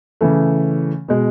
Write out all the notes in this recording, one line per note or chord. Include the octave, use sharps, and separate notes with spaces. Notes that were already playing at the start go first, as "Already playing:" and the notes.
C#3 E3 A3
B2 G#3